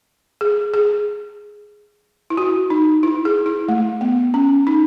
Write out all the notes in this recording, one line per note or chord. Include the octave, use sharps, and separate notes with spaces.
G#4
G#4
E4
F#4
D#4
E4
G#4
E4
A3
B3
C#4
D#4